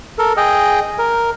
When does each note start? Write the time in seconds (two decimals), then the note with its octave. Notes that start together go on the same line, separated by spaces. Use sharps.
0.19 A4 A#4
0.37 G#4 D#5 G5
0.99 A#4